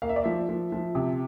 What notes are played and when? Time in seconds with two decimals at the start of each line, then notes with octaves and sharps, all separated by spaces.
0.02 A#3 F5
0.09 E5
0.16 D5
0.24 F3 E5
0.49 F3
0.72 F3
0.95 C3